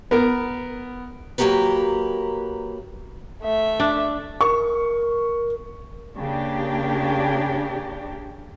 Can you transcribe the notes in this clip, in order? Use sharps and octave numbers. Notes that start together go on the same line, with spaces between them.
B3 A#4
F#3 A#3 D#4 G4 A#4 B4
A3 E5
D4
A#4 C#6
C#3 A#3 D4 G4